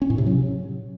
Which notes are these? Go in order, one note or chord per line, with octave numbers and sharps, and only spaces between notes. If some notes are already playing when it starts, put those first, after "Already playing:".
C#4
A2
C3
F#3